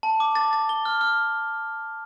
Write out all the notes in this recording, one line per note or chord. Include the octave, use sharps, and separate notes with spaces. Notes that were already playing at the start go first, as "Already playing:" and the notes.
A5
D6
A6
A6
G7
F6
F6